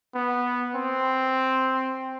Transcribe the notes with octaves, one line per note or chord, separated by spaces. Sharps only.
B3
C4